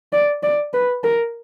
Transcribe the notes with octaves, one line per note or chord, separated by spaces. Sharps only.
D5
D5
B4
A#4